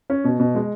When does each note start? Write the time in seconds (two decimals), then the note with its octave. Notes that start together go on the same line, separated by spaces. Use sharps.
0.10 C#4
0.24 B2
0.40 B2
0.55 G#3